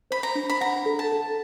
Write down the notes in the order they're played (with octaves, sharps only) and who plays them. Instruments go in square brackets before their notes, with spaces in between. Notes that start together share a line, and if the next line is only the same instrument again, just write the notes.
[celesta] C5 [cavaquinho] B5
[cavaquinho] A#5
[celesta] D4
[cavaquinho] B5
[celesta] F#5 [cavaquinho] A#5
[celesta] A4
[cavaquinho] A5
[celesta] A4